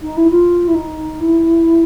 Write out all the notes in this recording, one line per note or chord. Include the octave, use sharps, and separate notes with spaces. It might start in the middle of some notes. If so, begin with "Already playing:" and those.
D#4
E4
F4
E4
D#4
E4